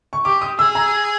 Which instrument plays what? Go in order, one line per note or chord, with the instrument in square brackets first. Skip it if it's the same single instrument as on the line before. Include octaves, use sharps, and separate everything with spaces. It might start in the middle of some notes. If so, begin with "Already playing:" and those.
[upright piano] C#6
[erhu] G4 [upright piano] D6
[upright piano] D#6
[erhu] G#4 [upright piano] E6
[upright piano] A#5